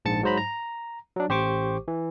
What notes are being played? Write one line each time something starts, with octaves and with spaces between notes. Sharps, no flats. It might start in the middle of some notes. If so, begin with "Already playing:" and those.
A#1 G#2 A5 A6 C#7
G#2 F#3 C5 A#5 B5
A#5
F#3 D4
A1 G4 C5 C#6 D6
E3